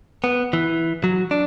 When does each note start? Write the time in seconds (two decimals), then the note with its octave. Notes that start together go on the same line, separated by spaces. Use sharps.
0.24 B3
0.53 E3
1.04 F#3
1.31 D4